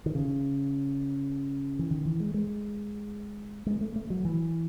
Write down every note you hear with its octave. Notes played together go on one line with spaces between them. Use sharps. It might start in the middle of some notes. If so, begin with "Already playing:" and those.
D#3
C#3
E3
D#3
E3
G#3
G#3
G#3
A3
A3
F#3
E3